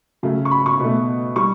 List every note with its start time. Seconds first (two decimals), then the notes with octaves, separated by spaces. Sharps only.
0.23 C#3 F#3 A3
0.45 C#6
0.51 B5
0.66 C#6
0.80 B2 A3
1.36 G3 C#6